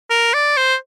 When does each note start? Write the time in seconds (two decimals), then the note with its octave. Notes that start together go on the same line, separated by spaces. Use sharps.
0.10 A#4
0.34 D5
0.57 C5